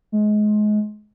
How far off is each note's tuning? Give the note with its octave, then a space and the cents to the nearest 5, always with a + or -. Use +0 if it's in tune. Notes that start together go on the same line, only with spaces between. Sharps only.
G#3 +25